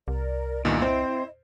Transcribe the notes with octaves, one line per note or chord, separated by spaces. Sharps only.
C2 A#4 D5
E2 G2 A#2 D#3 E4 D#5
C4 C5